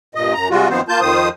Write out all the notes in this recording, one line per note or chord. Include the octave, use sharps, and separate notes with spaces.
G2 A#2 D#5
F#2 A#5
C3 G3 G#3 F4 F#4
F#2 D#3 F3 B3 C4 C5
A#3 F4 A5 G6
F2 D#3 F3 C5 D#6